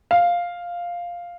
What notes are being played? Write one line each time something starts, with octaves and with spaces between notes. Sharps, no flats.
F5